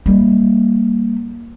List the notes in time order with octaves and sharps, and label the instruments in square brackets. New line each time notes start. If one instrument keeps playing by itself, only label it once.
[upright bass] G3 A#3